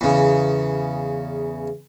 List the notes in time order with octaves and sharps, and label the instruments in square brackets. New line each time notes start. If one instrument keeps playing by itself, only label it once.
[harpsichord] E2 C#3